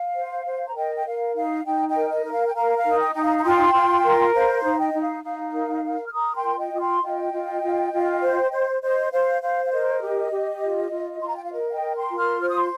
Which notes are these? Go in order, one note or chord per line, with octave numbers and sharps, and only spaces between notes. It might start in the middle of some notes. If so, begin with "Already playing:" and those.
Already playing: F5
C5
C5
A#5
A#4 D#5 G5
G5
A#4 F5
D#4 F5
D#4 D#5 G5
D#5 G5
A#4
D#5
A#4
F5
G5
A#4 F5 A#5
F5
D#4
D#5 G5
D#4 G5
F5 A#5
A#5
F4 G5 C6
F4
A#4
C5 F5 A#5
F5 A#5
D#4
D#5 G5
D#4
F5
D#4 F5
A#4
A#4
F6
A#4 A#5 D#6
G5 C6
F4
D#5 G5
F4 D#6
G5 C6
F4 D#5 G5
F4
F4
F4
C5
C5
C5 D#5
C5 F5
C5 F5
F5
A#4 D#5
G4
G4
F4
F4
F4 C6
A#5
G5
F5
A#4 D#5
F5
D#5 G5
A#4
G5 C6
F4
C6 F6
C5 F6
D#6
C6